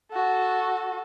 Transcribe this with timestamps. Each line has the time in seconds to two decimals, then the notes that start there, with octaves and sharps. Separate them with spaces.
0.12 F#4 A4